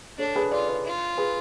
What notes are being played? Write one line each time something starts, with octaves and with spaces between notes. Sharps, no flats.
D4 A4 C#5
G#4 B4
F4 B4 D5
B4 D5
F4
G#4 B4